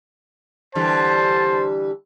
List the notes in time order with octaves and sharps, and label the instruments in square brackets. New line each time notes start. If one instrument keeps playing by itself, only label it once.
[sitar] D3 E3 G3 [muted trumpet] C5 [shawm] A5